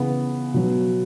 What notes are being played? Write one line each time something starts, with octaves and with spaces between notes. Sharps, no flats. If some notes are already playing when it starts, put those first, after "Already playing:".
Already playing: C#3 E3 B3
B2 F#3